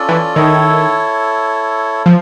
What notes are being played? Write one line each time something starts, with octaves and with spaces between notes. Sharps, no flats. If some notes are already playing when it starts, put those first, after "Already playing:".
Already playing: C#4 F4 A4 D5
E3
D#3 E4 A4 C#5
F3 F5